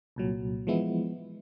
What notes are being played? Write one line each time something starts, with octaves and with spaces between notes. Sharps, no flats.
C2 A#2 F#3
E3 F3 G#3 B3 E4